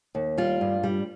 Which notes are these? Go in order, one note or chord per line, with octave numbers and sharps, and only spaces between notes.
D#2
G3 F4
G2
G3